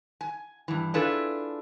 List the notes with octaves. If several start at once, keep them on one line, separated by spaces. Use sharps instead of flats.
G#5
G2 E3
D4 E4 F4 G#4 A4 B4